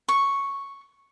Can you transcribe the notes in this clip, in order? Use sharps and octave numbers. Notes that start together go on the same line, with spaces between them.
C#6